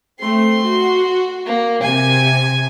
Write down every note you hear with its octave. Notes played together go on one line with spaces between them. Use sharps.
A3 C4 C6
F#4
A#3
C3 G#5